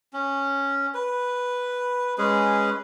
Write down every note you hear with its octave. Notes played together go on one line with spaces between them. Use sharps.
C#4
B4
G#3 C#4 G#4 B4